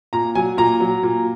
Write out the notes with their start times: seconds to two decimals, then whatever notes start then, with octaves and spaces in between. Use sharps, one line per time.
0.13 A#2 A#5
0.35 F#3 G#5
0.57 A#2 A#5
0.80 F#3
1.03 A#2